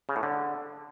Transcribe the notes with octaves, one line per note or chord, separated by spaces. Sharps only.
C#3
A2
D3